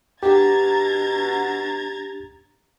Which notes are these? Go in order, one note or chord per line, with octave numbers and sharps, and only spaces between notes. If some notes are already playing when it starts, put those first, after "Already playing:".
B2 D4 G4 A#5 G#6 A6